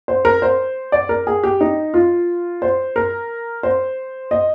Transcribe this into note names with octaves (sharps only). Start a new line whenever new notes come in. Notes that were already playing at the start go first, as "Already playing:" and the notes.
C5
A#4
C5
D5
A#4
G#4
G4
D#4
F4
C5
A#4
C5
D#5